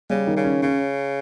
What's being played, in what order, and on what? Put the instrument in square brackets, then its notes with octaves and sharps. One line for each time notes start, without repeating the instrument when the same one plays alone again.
[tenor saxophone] C#3 [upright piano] G3
[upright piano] D#3
[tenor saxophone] C#3
[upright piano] C#4
[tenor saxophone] C#3 [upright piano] C#4